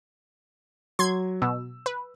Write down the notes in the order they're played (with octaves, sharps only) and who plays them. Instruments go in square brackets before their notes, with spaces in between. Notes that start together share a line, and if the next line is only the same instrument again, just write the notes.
[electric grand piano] F#3 [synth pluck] C6 G#6
[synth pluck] B2 [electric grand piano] E6
[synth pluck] B4